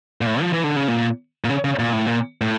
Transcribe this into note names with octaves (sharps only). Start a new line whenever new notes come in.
A#2
A2
F3
E3
D3
C#3
A#2
A#2
C#3
C#3
A#2
A2
A#2
A2